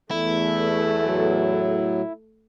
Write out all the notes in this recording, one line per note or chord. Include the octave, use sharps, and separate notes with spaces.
E2 A3 E4
A2 F#3